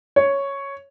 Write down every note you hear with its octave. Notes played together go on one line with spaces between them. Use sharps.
C#5